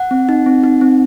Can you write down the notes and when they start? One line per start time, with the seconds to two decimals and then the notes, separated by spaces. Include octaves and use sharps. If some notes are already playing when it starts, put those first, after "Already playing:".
Already playing: F#5
0.11 C4
0.29 D#4
0.46 C4
0.64 D#4
0.81 C4